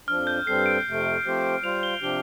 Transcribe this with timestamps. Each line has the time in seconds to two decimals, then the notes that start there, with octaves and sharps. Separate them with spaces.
0.08 F2 F3 D4 F6
0.27 G6
0.47 G2 G3 C4 A4 C7
0.66 D7
0.86 F2 C3 A3
1.24 F3 A3 C4 G4 C5
1.63 G3 F4 C5 F5 F7
1.83 G7
2.01 C3 F3 D4 G4 G7